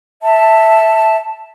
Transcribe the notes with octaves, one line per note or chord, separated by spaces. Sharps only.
E5 A5